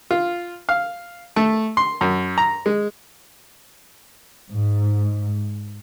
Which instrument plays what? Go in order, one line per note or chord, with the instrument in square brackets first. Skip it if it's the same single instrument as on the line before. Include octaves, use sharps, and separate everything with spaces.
[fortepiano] F4
F5
A3
C6
F#2
A#5
G#3
[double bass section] G#2